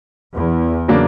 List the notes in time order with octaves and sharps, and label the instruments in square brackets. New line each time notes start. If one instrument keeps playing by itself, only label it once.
[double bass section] E2
[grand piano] C#3 F#3 A#3 D4